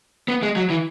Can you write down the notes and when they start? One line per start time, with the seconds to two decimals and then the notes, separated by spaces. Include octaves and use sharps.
0.28 B3
0.43 G#3
0.56 F#3
0.70 E3